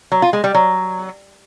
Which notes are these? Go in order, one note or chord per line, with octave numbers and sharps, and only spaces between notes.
F#3
F4
G#3
G3
F#3